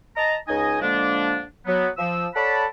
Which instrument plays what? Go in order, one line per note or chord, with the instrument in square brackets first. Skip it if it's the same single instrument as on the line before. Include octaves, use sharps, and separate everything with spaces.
[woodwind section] D#5 A5 A#5
C#2 D#4 D#5 G#5
D3 F3 G#3 A#3 D4
F#3 B3
F3 E6
A4 C#5 D5 F#5 A5 B5